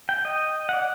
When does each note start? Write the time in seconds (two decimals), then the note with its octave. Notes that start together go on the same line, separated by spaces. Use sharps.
0.09 G5
0.25 D#5
0.69 D5 F#5